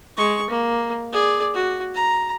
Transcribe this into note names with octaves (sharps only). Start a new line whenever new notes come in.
G#3 C#6
A#3
G#4 D5
F#4
A#5